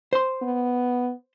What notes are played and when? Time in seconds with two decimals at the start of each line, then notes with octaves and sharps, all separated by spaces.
0.13 C5 C6
0.42 B3